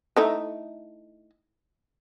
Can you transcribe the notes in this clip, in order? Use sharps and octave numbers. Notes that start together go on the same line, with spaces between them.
A3 D#4 E4